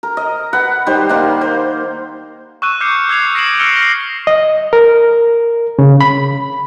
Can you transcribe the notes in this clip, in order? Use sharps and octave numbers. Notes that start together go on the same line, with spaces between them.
A#4
D#5
B4 F#5
D#3 G3 C5
D#3 A#3 F#5 C6
C5
C#6 E6 F#6 D#7 E7
D6 F6 G6 C7 C#7
E6 G#6 C7 F7
D#6 A#6 C7 D7 E7 F#7
E6 F6 A#6 C#7 D7 G7
A#6 C7
D#5
A#4
C#3
B5